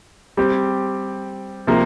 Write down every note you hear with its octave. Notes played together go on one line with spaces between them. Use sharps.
G3 C4 G4
C3 F3 A#3